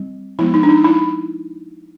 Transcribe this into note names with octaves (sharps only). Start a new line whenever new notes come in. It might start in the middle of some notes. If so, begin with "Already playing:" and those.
Already playing: G3 C4
F3 G#3 B3 E4
D#4
D4
D#4
E4